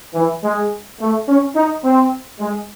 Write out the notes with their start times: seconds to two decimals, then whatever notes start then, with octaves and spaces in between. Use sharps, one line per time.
0.14 E3
0.43 G#3
1.00 A3
1.28 C#4
1.55 D#4
1.83 C4
2.39 G#3